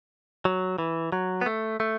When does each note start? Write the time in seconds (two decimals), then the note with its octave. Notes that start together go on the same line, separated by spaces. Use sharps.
0.45 F#3
0.78 E3
1.12 F#3
1.41 B3
1.46 A3
1.80 A3